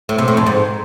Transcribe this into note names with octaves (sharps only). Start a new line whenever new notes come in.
A2
C3
A2
F2
G#2